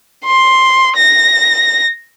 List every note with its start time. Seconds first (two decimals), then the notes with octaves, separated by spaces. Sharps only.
0.24 C6
0.96 A#6